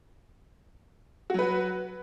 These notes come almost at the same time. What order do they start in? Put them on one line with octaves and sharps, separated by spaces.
F#4 F#3 B4